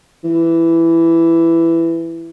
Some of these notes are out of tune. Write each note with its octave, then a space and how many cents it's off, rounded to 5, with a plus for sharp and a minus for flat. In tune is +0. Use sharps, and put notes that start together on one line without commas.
E3 +10